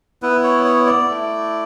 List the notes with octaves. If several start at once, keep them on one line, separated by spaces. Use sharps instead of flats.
B3 E4 B4
C#5
C#5
D5
A3 E4